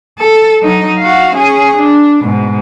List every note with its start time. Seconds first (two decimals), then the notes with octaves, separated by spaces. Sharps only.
0.19 A4
0.60 F#3 D#4
0.99 F#4 F5
1.35 C#4 G#4
1.77 D4
2.24 G#2 B2